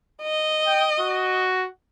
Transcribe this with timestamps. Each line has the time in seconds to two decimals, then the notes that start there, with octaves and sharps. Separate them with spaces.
0.23 D#5
0.67 G5
1.00 F#4